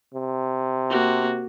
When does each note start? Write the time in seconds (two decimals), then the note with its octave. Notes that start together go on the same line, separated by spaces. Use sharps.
0.14 C3
0.89 A#3 F#4